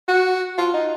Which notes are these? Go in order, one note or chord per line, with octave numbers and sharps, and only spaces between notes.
F#4
F4
D#4